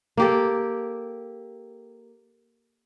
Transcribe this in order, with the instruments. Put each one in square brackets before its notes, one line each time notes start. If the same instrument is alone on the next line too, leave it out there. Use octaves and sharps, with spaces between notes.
[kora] A#3 G4 A4